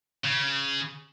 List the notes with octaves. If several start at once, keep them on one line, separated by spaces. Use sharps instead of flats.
C#3